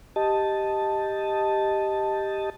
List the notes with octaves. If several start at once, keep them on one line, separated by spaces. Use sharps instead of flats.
G4 D#5 A5